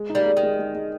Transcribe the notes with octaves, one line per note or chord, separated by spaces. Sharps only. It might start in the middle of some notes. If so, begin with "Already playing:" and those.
Already playing: G#3
D#4
G3 A#3
G#3
D#3
G#3
G#3
G#3